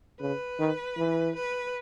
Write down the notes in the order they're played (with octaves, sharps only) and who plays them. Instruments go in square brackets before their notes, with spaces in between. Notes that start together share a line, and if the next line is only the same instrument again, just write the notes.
[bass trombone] C#3 [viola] B4
[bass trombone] D#3
E3
[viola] B4